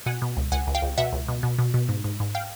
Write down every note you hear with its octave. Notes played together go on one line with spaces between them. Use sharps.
B2 F#5 G#5
B2
C#2
C#2 F#5 G#5
C#2
F5 G5
C#2
B2 E5 F#5
C#2
B2
B2
B2
B2
G#2
G#2
G#2
F5 G5